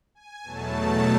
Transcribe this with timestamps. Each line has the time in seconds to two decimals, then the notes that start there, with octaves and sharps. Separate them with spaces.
0.15 G#5
0.43 E2 B2 F#3 A3 A5